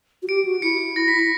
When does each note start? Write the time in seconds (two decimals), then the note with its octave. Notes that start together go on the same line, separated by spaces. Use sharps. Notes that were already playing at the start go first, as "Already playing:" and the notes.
0.22 F#4
0.28 G4 D7
0.45 F#4
0.62 E4 C#7
0.96 A#6
1.08 B6
1.19 B6